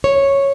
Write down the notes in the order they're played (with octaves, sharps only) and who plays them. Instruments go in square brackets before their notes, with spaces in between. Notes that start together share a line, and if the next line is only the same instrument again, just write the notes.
[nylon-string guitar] C#5